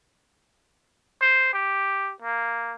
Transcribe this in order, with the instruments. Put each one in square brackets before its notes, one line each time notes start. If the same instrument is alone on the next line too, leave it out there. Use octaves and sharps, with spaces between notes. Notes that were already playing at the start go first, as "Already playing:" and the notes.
[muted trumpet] C5
G4
A#3